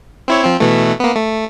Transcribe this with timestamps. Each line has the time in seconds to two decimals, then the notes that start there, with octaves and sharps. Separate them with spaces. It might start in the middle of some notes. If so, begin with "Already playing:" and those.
0.28 C4 E4 C#5
0.44 F3 C4
0.60 B2 E3 A3
1.00 A#3 B3
1.16 A3